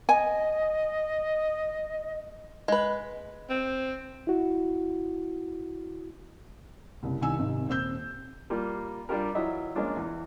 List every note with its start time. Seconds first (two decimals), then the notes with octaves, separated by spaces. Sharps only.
0.09 D#5 G#5
2.68 G#3 B4
3.49 C4
4.27 E4 F#4
7.03 F#1 C2
7.21 C2 D#3 G#5 E6
7.39 G#1 C3 D#3
7.68 D#1 C4 C5 E6 G6
8.50 G3 A#3 F4
9.09 G3 D4 F4 G4 A#4
9.35 E3 F#3 F4 D#5 E5
9.75 F3 G#3 A#3 C#4 D4 F4
9.97 E2 E3